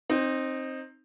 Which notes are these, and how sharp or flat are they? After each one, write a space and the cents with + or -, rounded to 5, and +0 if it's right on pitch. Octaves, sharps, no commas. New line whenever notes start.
C4 +15 D#4 -10